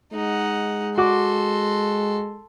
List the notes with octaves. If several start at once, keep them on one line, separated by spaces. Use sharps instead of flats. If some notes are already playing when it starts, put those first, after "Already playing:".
G#3 D#4 F#5
F#4 A4 C6 D6